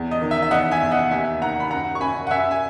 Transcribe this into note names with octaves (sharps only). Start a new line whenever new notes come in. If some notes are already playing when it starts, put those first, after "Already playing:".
Already playing: E2
D#5
D#3
E5
E5
E2 D#5 F#5
E5 G#5
E2
D#5 F#5
D#2 E5 G#5
D#3 F#5 A#5
B5
F#2 F#5 A#5
C#6
F#2 G#5 B5
F#5
F#2 E5 G#5
G#5